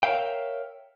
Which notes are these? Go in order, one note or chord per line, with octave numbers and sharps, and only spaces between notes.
A#4 C#5 E5 F5 G5